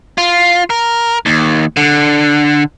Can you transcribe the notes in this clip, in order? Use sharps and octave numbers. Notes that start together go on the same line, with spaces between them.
F4
A#4
D#2
D3